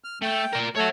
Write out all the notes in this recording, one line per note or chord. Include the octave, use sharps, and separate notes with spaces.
F6
A3 G5
A#4 D5
A3 A4 C#5 F#5